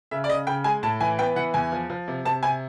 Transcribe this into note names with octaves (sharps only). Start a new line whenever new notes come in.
C#3 E5
D5
C#3 D#5
C#3 G5
G#3 G#5
A2 A5
E3 G#5
B3 G5
E3 F#5
E2 G#5
F3
F3
C3
C3 A5
C3 G#5